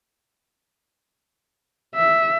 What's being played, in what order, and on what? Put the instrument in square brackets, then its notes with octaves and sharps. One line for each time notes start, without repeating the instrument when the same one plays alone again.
[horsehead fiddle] E5